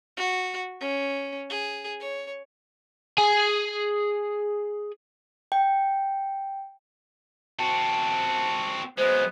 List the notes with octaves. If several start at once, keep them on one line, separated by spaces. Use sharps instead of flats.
F#4
C#4
G#4
C#5
G#4 G#5
G5
C4 F#4 A5
F#3 G#3 B3 C5